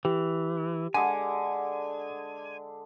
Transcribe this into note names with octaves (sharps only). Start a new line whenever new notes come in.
E3 G4
D3 G#3 G#5